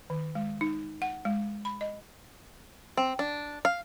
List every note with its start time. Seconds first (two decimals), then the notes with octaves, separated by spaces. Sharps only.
0.10 D#3
0.35 G#3
0.61 D#4
1.02 F#5
1.25 G#3
1.65 B5
1.81 D#5
2.97 C4
3.19 D4
3.65 F5